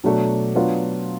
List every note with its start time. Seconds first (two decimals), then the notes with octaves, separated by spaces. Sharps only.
0.04 B2 F#3 A3 D4 F#4
0.55 F#3 B3 D4 F4